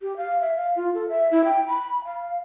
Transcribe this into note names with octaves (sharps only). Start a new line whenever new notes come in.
G4
F5
E5
F5
F4
A4
E5
E4
G5
B5
F5